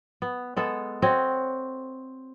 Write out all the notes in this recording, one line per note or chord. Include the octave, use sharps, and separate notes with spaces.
B3
G#3 B3 A4
C4 F#4 C#5 D#5